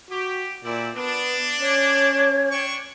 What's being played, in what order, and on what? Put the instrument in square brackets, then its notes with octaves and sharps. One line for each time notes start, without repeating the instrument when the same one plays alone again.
[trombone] F#4 [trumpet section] G4
[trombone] A#2 [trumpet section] C4 E4 D5
[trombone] B3 [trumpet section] D4
[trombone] C#4 [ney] C#5
[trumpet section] D4 G5 C#6